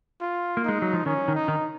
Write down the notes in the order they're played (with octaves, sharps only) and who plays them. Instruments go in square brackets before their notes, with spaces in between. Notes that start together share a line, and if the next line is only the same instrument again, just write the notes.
[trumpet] F4
[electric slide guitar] A#3
[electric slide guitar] G#3 [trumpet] D#4
[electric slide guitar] F#3
F3
[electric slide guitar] D#3 [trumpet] C#4
[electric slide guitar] D#3
[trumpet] D#4
[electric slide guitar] D#3